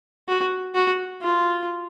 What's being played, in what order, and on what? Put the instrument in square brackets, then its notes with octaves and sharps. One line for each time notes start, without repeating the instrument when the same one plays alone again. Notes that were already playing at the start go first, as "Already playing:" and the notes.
[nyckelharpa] F#4
F#4
F4